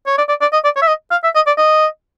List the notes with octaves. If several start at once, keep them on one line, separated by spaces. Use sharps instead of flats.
C#5
D5
D5
D5
D#5
D5
C#5
E5
D#5
F5
E5
D#5
D5
D#5